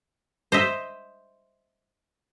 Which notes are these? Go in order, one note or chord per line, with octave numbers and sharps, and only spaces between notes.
C5 D#5 E5